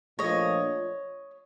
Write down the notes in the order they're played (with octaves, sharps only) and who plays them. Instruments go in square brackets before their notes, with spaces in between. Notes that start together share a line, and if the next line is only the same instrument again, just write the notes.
[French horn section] A#2 F3 A3 D4 F4 [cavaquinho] C#5 D#5